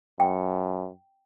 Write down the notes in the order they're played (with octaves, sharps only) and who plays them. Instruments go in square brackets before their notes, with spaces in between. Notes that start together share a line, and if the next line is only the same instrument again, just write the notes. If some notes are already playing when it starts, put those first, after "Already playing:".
[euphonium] F#2 [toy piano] G5